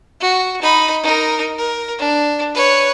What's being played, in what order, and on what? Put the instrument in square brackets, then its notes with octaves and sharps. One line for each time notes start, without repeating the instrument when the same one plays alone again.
[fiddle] F#4
D#4 B5
D#4 A#4
A#4
D4
B4 C#5